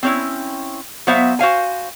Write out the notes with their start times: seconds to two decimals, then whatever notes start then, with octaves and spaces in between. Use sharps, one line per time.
0.03 C4 C#4 E4
1.07 F#3 B3 C5 E5 F5
1.39 F#4 C5 F5 G#5